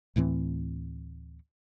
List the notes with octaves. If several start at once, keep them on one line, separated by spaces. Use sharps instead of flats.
D2 A2 E3 C4